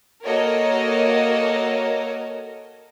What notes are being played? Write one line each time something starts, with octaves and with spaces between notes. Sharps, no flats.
A#3 F#4 A4 A#4 C#5 D#5